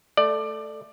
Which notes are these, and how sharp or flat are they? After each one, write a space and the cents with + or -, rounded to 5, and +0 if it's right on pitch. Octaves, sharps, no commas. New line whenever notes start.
A3 +0 D5 +20